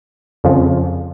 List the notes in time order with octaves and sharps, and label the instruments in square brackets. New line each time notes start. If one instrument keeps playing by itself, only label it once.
[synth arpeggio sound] F2 C#3 F3